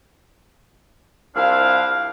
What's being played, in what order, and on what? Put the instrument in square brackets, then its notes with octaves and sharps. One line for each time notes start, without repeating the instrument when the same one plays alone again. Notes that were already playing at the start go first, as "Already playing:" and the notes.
[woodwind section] C2 F3 D4 E4 C5 F5